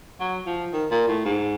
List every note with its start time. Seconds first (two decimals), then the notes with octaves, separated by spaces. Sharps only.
0.20 F#3
0.46 F3
0.73 D#3
0.91 A#2
1.08 A2
1.25 G#2